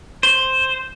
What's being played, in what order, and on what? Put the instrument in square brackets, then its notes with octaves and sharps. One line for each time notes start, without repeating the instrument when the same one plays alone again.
[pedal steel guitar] C5